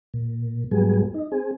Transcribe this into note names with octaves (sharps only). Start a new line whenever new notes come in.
A#2
G#2 F#3 G3 B3 G#4
D#4
C4 G#4